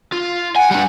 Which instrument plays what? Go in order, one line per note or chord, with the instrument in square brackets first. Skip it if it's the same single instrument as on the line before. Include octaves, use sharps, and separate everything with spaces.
[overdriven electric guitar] F4
[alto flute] F#5 [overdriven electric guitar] G#5
[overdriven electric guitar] G3 D4